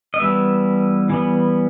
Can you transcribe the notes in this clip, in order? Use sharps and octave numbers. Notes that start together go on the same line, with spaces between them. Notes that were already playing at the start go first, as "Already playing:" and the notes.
D#5
E3 G3 B3 E5
E3 G3 B3